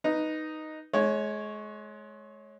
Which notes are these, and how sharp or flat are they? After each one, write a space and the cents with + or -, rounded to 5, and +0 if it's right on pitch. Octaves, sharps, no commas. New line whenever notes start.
D#4 +0 B4 +0
G#3 +30 C#5 -5